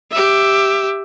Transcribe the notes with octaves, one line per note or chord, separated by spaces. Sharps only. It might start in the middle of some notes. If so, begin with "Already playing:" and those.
G4 E5